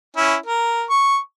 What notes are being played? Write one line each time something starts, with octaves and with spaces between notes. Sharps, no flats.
C#4 E4
A#4
C#6